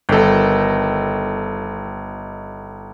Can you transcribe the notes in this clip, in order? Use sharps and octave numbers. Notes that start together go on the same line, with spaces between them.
G1 D#3 A4